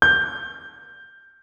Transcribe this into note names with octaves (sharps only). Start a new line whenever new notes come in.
G6